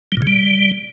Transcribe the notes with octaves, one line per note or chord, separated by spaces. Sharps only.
G3
A#2
C#3
G3